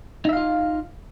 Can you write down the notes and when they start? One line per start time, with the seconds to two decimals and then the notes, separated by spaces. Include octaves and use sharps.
0.25 D#4
0.29 E5
0.33 F5
0.37 F4